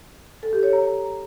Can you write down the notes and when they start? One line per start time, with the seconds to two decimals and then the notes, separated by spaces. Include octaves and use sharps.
0.43 A4
0.53 G4
0.63 C#5
0.73 A#5